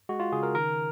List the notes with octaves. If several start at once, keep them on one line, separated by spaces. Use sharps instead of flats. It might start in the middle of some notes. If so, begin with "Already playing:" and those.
G#3 F#4
F4
C#3 G#4
A#4
D#3 A#4